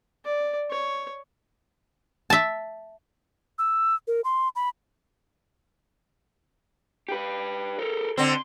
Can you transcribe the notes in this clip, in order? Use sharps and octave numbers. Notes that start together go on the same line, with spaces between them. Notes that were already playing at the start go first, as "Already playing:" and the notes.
D5
C#5
E5 A5
E6
A#4
C6
B5
G4 B4
A4 A#4
D3 C4 C6